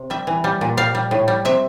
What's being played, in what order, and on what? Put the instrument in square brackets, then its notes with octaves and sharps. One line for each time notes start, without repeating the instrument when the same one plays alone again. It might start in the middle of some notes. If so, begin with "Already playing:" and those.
Already playing: [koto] C3
G3 E5
E3
G3
A#2
G3 F5
G3
A2
G3
C3 E5